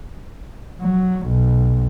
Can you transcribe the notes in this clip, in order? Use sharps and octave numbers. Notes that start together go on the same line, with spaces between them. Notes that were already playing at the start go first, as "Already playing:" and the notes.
F#3
B1